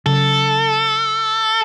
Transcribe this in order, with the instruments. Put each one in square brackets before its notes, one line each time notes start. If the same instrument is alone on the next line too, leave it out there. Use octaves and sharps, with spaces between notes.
[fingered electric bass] C#3 F#3 [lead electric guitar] A4